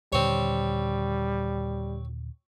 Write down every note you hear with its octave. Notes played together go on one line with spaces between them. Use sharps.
D#2 A#2 D3 G3 C4 C#5